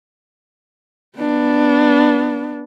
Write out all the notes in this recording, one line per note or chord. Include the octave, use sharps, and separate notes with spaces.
B3 D4